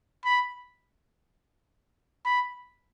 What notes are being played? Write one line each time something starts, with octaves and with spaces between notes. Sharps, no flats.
B5
B5